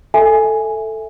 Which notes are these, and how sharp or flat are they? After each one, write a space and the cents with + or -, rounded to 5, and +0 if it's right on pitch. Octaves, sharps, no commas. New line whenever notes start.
A4 +5 E5 +0 G#5 +0